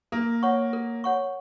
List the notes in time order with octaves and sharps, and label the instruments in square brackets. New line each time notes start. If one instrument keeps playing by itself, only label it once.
[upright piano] A#3 [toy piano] A#4
[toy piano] C#5 F#5 C#6
A#4
C#5 F#5 C#6